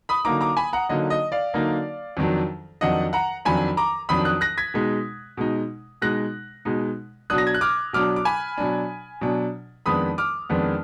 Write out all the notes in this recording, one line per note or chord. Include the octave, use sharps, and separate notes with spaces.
B5 D#6
D3 F#3 A#3 D#4 A#5 D6
A#5 D6
G#5 B5
F#5 A#5
D3 F#3 A#3 D#4 D#5
D#5
D5 F5
D3 F#3 A#3 D#4
F2 D#3 F#3 D4
F2 D#3 F#3 D4 D#5 F#5
F#5 A#5
F2 D#3 F#3 D4 G#5 B5
A#5 D6
F2 D#3 F#3 D4 B5 D#6
D#6 F#6
F#6 A#6
G#6 B6
B2 G#3 D#4
B2 G#3 D#4
B2 G#3 D#4 F#6 A#6
B2 G#3 D#4
B2 F#3 D4 D#6 F#6
A#6
G#6
F#6
D6 F6
B2 F#3 D4 D6 F6
D6
G#5 B5
B2 F#3 D4
B2 F#3 D4
F2 D#3 G#3 B3 D4 B5 D#6
D6 F6
F2 D#3 G#3 B3 D4